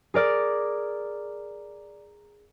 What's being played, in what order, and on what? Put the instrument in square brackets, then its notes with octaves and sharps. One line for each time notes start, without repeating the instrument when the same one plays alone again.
[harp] G#4 A#4 D5 F6